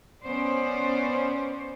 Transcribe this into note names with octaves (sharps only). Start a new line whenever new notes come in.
B3 C#4 C5 D5